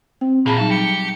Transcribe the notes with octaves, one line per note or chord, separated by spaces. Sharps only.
C4 G5
A#2 E3 A#3 G#4 A5 B5
F#3 G3 D#4 A4
G4 C#7